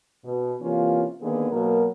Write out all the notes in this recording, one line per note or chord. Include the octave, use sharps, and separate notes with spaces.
B2
C3 E3 A#3 C#4 F4
D3 D#3 A#3 B3 D4 G#4
B2 F#3 A#3 A#4